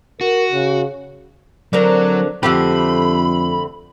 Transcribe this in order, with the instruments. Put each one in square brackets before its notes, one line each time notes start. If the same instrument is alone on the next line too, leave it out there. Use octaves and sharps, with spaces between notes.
[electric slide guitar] F#4 [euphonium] A#4
[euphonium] C#3
[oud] D3 C4 A#4 [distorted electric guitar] F#3
[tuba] F2 [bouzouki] D3 A3 C4 [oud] G4 [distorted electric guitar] B5